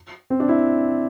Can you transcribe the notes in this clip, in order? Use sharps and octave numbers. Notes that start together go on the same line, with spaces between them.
C4
D4
E4